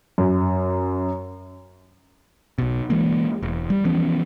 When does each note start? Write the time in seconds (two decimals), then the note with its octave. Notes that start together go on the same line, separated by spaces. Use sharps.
0.18 F#2
2.58 B1 B2
2.90 E3 G#3 A#3
3.43 E1
3.70 G3
3.85 E3 F3 B3 C#4